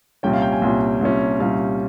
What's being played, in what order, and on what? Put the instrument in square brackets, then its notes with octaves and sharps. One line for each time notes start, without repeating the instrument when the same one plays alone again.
[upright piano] C2 A#2 G3 C#4 G5
F5
G5
G#5
C2 A#2 G3 C#4
C2 A#2 G3 C#4
C2 A#2 G3 C#4 F5